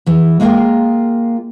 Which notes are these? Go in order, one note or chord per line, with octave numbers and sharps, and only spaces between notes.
E2 E3
G#3 A#3 F4 G#4 A#4 G5